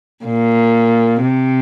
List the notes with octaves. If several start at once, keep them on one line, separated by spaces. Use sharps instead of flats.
A#2
C3